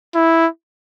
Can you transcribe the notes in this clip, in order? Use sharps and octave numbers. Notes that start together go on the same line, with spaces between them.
E4